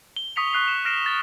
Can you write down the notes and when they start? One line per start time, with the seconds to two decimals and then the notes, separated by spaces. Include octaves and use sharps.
0.16 G7
0.36 C#6 D#6 B6 C#7 F7
0.53 C#6 F#6 C7 F7
0.68 E7
0.85 F6 A#6 C7 D7 E7
1.06 A6 G7